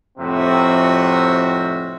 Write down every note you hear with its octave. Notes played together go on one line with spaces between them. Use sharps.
F2 A2 C3 C4 F#4 E5